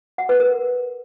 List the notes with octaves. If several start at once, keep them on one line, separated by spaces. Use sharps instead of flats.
F#5
B4
A#4